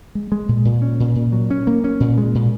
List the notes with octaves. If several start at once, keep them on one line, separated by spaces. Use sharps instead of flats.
G#3
G#3
A#2
A#2
C#4
A#2
A#2
F#3
C#4
A#3
C#4
A#2
G#3
A#2